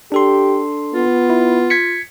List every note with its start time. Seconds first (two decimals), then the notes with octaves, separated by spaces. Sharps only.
0.12 D4 G4 A4 C6
0.94 B3 F4
1.30 E4
1.70 G#6 B6 C#7